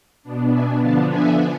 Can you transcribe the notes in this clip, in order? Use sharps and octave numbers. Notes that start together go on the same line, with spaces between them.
B2 B3 D4
E5 G#5
D3 F3 B3 D4 F5 A5
E5 G#5